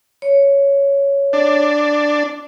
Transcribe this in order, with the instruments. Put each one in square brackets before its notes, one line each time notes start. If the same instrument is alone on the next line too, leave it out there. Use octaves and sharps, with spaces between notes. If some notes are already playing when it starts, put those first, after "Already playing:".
[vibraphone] C#5
[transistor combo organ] D4